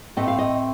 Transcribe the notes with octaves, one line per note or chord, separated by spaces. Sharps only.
A2 A3 C4 D#5
F5
D#5